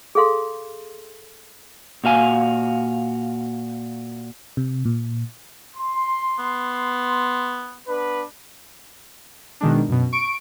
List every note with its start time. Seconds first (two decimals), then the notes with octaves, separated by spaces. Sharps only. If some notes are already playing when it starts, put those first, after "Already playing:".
0.15 G#4 A4 F5 C6
2.04 A#2 F#4 F5 G#5
4.57 C3
4.85 A#2
5.76 C6
6.39 B3
7.88 B3 D4 B4
9.61 B2 D#3 G#3 D4
9.89 F#2 B2
10.13 C#6 D7